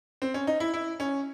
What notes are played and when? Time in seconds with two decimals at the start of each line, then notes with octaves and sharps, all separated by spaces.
0.22 C4
0.34 C#4
0.47 D#4
0.60 E4
0.74 E4
1.00 C#4